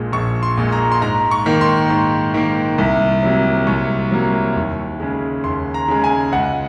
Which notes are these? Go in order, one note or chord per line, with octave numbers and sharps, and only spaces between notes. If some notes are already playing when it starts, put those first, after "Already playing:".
Already playing: A#1 A#2 G#3
A#1 C#6
C6
A#2 G#3
A#5
C6
G#2 A#5
C#6
D#3 A#3
C6
G#2
D#3 A#3
C2
C3 F#3 A#3
C2 C#6
C3 F#3 A#3
D#2
C#3 G#3
D#2 C6
A#5
C#3 G#3
G#5
C#2 F#5